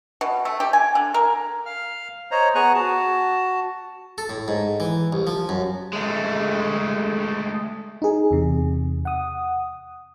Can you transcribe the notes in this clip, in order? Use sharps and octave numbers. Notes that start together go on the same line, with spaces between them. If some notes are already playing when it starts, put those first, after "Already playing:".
B2
A3
G4
G#5
D3
A#4
F5 F6
C5 C#5 D#5 A#5
B3 G#4 G#5 A#5 C#6 F#6
F#4 A5
A4
A2
G#2
E3
C2
F3
F#2
G#3 A3
D#4 G#4
E2 C3
F#5 D#6